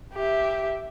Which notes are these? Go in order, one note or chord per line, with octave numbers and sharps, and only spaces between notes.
G4 E5